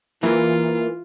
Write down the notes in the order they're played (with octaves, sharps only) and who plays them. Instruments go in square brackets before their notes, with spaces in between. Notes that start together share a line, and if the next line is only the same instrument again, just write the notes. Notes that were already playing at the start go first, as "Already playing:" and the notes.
[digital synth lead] E3 [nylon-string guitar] A#3 A#4 [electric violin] F4